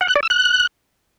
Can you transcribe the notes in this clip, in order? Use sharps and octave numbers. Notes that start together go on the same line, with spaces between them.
F#5
F#6
D5
E6
F#6